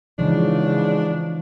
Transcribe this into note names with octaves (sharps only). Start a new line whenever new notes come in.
G#2 C#3 E3 F3 D4